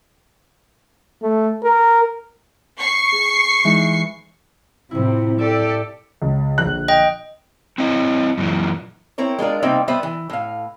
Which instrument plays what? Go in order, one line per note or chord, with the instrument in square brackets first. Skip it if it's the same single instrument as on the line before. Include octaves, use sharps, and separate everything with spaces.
[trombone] A3
A#4
[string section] C#6 C7
[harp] G#4
E3 G#3 D#4
[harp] A2 E4 [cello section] C3 F3
[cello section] G4 A4 D5 [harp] E5
[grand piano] C#2
A#1 D3 F#6
[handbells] D#5 G5
[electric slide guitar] C4 E4 D#5
F#2 A#2 E3
[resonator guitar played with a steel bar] C4 E4 A#4 C#5
G#3 D4 F4 A#4
C3 G3 A#3 C4 D#4 E5
G3 B3 B4 C5 E5
E3
A2 F5